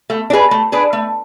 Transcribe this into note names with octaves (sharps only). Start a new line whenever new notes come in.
A3
D4
G#4 B4
A3
D4 G#4 B4
A3